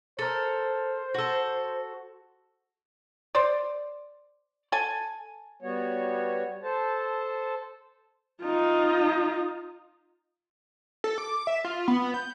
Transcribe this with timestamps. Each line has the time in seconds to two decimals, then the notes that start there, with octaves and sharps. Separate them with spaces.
0.19 A4 A#4 C5
1.14 F#4 A4
3.35 C5 D5
4.72 A4 G#5
5.62 G3 B3 F#4 C#5
6.63 A4 C5 A5
8.42 D#4 F4
11.04 A4
11.18 D6
11.47 E5
11.64 F4
11.88 B3
12.14 G6